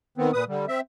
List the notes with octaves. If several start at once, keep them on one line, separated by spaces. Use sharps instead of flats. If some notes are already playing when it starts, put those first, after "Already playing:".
D#3 B3 C4
A#2 B4 D#6
D3 G3
C4 E5